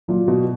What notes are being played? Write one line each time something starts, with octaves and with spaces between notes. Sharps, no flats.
A#2 F#3
B2